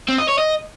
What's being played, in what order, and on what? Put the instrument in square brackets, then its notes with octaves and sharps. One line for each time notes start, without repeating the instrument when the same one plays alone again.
[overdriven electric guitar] C4
D#5
C#5
D#5